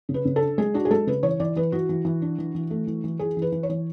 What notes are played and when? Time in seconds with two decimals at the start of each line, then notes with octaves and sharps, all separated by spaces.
0.09 C#3
0.14 B4
0.25 C#3
0.36 A4
0.41 D4
0.58 G#3 G#4
0.74 D4 F#4
0.85 G#4
0.91 G#3 A4
1.07 C#3 B4
1.23 E3 C#5
1.40 E3 D5
1.56 E3 B4
1.72 E3 F#4
1.89 E3
2.05 E3
2.22 D4
2.38 E3
2.55 E3
2.71 A3
2.87 E3
3.04 E3
3.19 E3 G#4
3.37 E3
3.42 B4
3.52 E3
3.63 C#5
3.69 E3